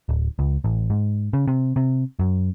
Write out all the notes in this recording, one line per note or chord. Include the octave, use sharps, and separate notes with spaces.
D1
C#2
A1
G#2
C#3
C3
C3
F#2